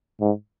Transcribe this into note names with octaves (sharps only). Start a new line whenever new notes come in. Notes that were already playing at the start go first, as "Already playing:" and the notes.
G#2